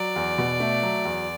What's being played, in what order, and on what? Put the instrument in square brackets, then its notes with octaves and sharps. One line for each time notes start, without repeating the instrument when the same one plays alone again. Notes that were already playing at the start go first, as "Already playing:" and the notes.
Already playing: [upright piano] F#3 [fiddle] D5
[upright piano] E2
B2
A3
F#3
E2